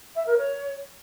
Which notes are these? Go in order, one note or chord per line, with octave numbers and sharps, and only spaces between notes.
E5
A#4
C#5